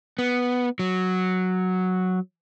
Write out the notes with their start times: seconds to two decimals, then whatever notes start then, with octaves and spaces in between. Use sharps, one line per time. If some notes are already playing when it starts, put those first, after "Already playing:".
0.19 B3
0.79 F#3